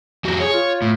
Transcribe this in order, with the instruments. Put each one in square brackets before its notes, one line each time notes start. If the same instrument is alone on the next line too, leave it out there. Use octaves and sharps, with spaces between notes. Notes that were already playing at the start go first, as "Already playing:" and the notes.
[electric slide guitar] F2 F#4 G4
[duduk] G#4 [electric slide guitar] C#5
[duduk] F4
[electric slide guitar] A2